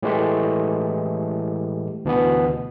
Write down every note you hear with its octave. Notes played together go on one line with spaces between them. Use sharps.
A2 E3 G#3 A3 G4
D2 B2 E3 B3